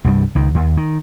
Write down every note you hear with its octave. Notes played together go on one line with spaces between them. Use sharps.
C2 G2 E3 G3
C#2 D#3
D#2
D#3